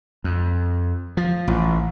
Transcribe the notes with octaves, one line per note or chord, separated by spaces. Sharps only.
F2
F3
A1